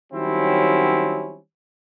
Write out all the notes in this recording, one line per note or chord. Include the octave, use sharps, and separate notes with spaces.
D#3 F#3 G3 C4 C#4 E4